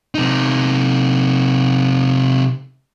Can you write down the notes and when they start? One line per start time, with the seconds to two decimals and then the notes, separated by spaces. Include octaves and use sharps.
0.15 C3 D#4